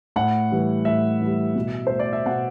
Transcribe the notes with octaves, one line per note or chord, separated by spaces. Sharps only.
A2 F#5
E3 G3
A2 E5
E3 G3
B2
A3 C5
D5
E5
B2 F#5